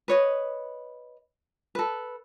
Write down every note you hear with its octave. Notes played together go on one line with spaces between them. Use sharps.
B4 C#5 D#5
A4 B4